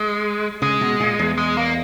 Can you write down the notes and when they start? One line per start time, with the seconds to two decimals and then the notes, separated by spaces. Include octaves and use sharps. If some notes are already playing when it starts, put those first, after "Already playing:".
Already playing: G#3
0.62 C#3 G#3
0.81 B2
1.00 A#2
1.19 E2
1.38 G#3
1.57 A#3